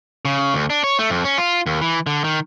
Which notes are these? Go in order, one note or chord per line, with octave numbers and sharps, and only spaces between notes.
C#3
D2
D4
C#5
A3
F2
C#4
F4
D#2
E3
D3
D#3